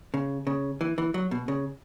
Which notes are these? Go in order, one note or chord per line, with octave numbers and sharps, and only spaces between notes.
C#3
C#3
E3
E3
F#3
B2
C#3